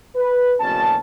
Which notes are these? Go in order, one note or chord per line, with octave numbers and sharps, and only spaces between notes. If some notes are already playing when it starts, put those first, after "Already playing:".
B4
F#1 D2 B2 C#4 A5